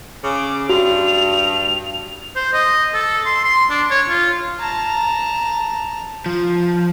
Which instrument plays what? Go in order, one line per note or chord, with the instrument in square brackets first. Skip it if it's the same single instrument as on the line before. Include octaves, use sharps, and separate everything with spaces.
[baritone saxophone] C#3 [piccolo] D6
[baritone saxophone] G2 [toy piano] F#4 [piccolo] F7
[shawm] C5
D#5
A4
C6
C6
D4
C#5
F4
[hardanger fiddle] A5 A#5
[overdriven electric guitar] F3